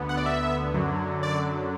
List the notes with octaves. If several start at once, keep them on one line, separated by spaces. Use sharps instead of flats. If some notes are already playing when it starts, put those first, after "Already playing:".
Already playing: D2 D3 B3
F#5
D5
E5
F#2 D3 F#3
D5